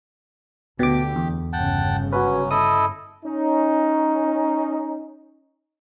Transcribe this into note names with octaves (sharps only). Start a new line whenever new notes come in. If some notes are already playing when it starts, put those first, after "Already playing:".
D2 B2 D3 A3 G4 D6
E2
G1 C#3 F#5 G5 A5
F#3 C#4 F#4 B4
E4 A4 D#5 D#6
C#4 D#4